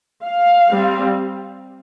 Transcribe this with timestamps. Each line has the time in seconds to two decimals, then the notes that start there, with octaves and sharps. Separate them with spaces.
0.24 F5
0.71 G3 C4